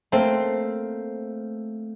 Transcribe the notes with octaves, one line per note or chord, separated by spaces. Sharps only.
A3 A#3 C4 C5